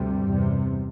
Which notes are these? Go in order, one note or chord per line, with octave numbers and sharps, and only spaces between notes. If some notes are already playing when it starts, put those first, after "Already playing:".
Already playing: D2 G2 C3 G3
E2 C3